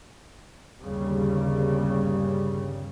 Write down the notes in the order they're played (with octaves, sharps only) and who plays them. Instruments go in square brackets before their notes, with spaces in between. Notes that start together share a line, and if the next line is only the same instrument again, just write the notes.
[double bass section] G1 D#2 C#3 G3